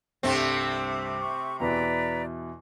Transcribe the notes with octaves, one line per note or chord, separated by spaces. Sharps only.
C2 G2 C3 A3 C4
C#6
E2 B2 E4 B4 D5 A#5